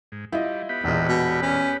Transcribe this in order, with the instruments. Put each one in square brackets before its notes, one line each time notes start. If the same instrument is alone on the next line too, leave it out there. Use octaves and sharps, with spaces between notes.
[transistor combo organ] G#2
[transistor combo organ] G3 [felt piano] E4 F4 D#5
[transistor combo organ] B3 G4 B5
[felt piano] E1 A#2 D#5 [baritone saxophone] E2
[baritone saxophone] B2
C#4